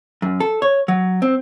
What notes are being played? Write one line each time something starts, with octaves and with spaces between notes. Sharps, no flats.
F#2
A4
C#5
F#3
C4